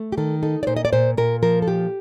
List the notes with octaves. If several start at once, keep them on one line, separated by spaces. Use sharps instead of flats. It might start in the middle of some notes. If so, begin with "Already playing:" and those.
Already playing: A3
G4
D#3 A4
D#4 A4
D5
A#2 C5
D#5
D5
A#2 C5
A#2 A#4
F3 A#4
A4
A#2 G4